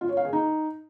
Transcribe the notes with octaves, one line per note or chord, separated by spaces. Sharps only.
F4
C#5
F5
G#4
D#4